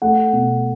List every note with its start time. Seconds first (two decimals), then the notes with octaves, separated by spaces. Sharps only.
0.02 A3 F#5
0.33 B2